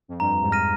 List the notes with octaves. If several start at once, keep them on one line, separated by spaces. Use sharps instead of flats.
F2
G2 A#5
F2 G#2
F6 A#6 D#7